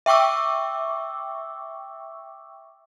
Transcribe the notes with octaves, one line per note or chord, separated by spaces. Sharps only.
E5 G5 C#6 D6 E6